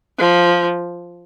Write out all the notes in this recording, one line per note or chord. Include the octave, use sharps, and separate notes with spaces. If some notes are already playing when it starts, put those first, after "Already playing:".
F3